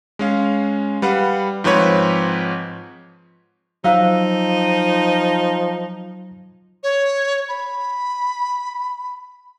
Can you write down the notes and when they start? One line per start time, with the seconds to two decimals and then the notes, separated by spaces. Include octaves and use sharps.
0.19 G#3 C#4 F5
1.02 G3 B4 F5 F#5
1.64 G#2 F3 C4 B4 C#5 G#6
3.84 F3 F#3 D#4 C5 F5 E6
6.83 C#5
7.49 B5